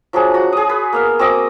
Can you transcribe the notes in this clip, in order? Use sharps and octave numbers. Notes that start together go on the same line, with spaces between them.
F3 F#3 D4 G#4
F#4
G#4 D#6
B4
A#3 B3 F5
C4 F#4 D#5 D6